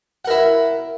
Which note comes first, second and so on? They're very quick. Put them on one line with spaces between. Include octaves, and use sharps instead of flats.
F#5 A#4 E4